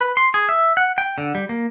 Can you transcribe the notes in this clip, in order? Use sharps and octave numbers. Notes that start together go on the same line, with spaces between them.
B4
C6
G#4
E5
F#5
G5
D3
G3
A#3